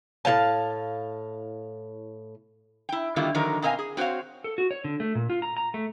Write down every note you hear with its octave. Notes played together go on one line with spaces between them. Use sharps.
A2 A3 F5 A5
E4 G5
D3 D#3 G3 A#3 E4 F4
D3 D#3 F3 F#3 D#4 A#4
B2 C4 A#4 D#5 F5 G#5
G#4
C4 F#4 C5 C#5 F5
A4
F#4
C#5
D3
A3
A#2
F4
A#5
A#5
A3